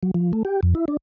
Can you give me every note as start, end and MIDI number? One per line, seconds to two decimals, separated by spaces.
0.03 0.11 54
0.14 0.32 53
0.33 0.43 57
0.45 0.60 67
0.63 0.74 41
0.75 0.85 64
0.88 0.97 62